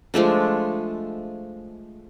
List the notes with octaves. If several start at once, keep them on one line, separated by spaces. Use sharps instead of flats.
F3 G#3 A3 D4